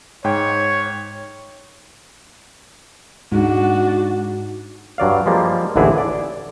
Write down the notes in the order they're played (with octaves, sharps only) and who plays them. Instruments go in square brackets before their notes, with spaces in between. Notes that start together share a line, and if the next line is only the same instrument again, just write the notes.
[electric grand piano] G#2 G5 [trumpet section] C#5
[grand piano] G#2 [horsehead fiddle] D4 F#4
[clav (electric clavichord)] G2 F#3 D5 F5
F3 G3 G#3 A#3
A1 D#2 D3 E3 E4 G#4
D5